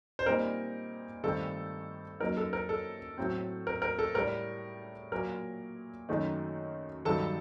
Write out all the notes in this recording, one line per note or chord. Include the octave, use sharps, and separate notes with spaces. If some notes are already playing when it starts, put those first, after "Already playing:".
C5
A#2 G3 C4 D#4 A#4
G2 D#3 A3 C4 A4
F#2 F#3 A#3 D#4 A#4
A4
A#4
A4
A2 F#3 C4
A#4
A#4
A4
A2 G3 D4 A#4
A#2 F#3 A#3 A#4
F#2 D#3 A3 D#4
G2 D#3 F#3 A4 A5